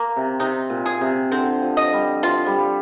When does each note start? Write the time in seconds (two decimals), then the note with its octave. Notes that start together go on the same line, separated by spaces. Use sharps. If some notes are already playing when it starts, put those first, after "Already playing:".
Already playing: A#3
0.16 C3
0.40 C3 D#4
0.70 A#2
0.86 G#4
1.01 C3
1.32 D3 C4
1.62 F3
1.77 D#5
1.93 G3
2.23 F3 F4
2.46 G3